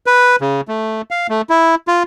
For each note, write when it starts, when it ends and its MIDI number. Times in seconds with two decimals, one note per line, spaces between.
0.06 0.36 71
0.41 0.61 49
0.68 1.02 57
1.11 1.27 77
1.29 1.42 57
1.50 1.75 64
1.88 2.03 65